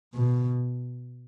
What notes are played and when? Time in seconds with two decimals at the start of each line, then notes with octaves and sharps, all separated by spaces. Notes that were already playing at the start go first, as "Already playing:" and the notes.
0.14 B2